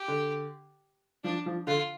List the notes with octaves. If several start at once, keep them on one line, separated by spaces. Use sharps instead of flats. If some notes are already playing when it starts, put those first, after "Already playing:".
Already playing: G4
D3
F3 D4
F3
D3 F4